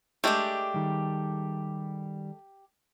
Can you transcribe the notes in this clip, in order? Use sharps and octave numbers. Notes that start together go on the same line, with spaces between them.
G#3 A3 D4 G4 G5
D#3 G3